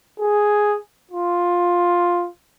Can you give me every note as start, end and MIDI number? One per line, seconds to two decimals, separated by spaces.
0.20 0.78 68
1.11 2.28 65